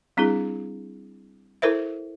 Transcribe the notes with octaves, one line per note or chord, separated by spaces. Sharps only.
G3 C4 D4 E4 G#4
E4 A4 A#4 C5 E5